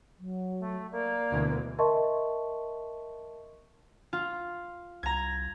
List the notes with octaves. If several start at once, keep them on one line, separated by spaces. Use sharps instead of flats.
F#3
A3
A#3 D5
D2 B2 E3
A#4 D#5 E5 A5 C6 C#6
F4
C2 A#5 G#6